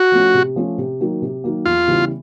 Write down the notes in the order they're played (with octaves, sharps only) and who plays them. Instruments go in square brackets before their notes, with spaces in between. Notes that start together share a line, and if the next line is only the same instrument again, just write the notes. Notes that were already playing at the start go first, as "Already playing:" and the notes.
Already playing: [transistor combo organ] F#4
[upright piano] F3 A3 C#4
C3
F3 A3 C#4
C3
D#3 F#3 A#3
C3
D#3 F#3 A#3
[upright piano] E2 [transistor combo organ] F4
[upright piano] C#3 E3 G3 B3